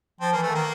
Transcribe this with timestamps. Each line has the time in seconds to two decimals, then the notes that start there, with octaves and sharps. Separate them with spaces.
0.21 F3 C4
0.32 E3 A#3
0.43 A3
0.51 D#3 A#3